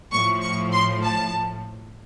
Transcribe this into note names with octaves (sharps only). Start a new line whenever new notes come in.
A2 F3 C#6
C#6
C6
A5